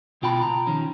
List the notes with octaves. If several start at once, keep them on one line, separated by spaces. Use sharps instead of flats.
C#2 B2 F4 G5 A5 B5
A#5
D#3 F3 C#4